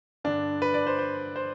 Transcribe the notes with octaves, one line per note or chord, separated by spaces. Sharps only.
G2 D3 D4
B4
D5
C5
C5
C5